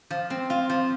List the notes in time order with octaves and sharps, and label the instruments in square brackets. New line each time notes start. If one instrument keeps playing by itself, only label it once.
[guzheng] F3
C4
F4
F3